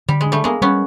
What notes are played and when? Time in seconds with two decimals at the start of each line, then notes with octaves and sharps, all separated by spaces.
0.09 D3 G3
0.21 G#3
0.26 D4
0.32 G3 A3
0.44 G#3 A#3 B3
0.61 G3 B3 C#4